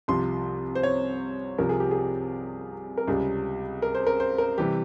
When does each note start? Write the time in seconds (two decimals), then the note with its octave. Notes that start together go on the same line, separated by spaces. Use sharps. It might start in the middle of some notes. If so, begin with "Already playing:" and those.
0.08 C2 C3 F3 C6
0.75 C5
0.83 C#5
1.58 C2 C3 F3 A#4
1.69 G#4
1.80 G4
1.91 G#4
2.97 A#4
3.08 C#2 C3 G3 G#4
3.82 A#4
3.95 C5
4.07 A#4
4.20 C5
4.38 A#4
4.57 C3 E3 G3 G4